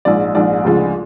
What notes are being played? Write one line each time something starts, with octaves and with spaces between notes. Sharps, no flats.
A#1 G#2 F3 D5
A#1 G#2 F3 D5
D2 C#3 F3 G#3